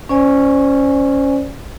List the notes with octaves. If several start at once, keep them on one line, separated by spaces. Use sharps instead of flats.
C#4 C5 D5 G#5